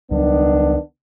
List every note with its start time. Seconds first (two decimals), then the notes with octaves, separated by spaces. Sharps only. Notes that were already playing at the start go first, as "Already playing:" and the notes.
0.11 C#2 D#3 F#3 G3 B3 D4